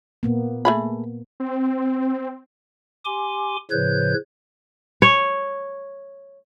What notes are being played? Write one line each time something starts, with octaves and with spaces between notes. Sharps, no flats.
A#2 A#3 B3
A3 G#4 B5
C4
G4 G#5 C6 D6
A2 C#3 F3 B4 C#5 G6
C#5